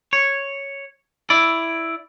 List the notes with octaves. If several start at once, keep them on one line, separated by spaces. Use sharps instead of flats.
C#5
E4 D5